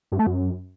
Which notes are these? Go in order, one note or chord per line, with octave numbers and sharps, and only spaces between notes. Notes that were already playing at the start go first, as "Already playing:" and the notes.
G2
A3
F#2